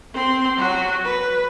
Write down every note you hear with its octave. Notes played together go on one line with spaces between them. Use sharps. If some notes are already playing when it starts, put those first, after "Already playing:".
C4 C6
F#3 F#4
B4